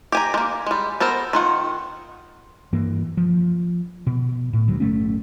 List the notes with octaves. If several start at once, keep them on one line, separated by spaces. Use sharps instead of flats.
G4 G#5 A#5
G#3 A#3
G3 G#3
B3 A4 A#4 C5
D#3 F4 F#5
G2 E3 A#3
F3
B2
A2
D2 F#3
G1 A3 C#4